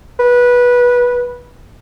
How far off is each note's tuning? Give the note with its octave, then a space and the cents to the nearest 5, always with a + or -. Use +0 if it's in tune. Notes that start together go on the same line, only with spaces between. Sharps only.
B4 -15